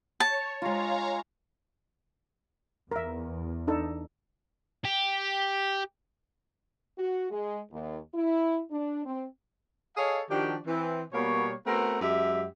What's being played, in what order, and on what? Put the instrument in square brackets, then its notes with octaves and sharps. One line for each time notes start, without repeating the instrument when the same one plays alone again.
[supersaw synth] C#5 [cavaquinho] A5
[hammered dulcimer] G#3 F4 [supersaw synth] C#5 F5 A#5
[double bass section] E2 [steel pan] A#4 E5
[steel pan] D4 D#4 A4
[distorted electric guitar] G4
[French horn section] F#4
G#3
D#2
E4
D4
C4
[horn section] G#4 A4 C#5 D#5 F5
D#3 F3 D4 F#4 G4
E3 C4
B2 G3 A#3 B3 C#5
A3 B3 C4 F#4 G#4 A#4
F#2 G#3 G4 E5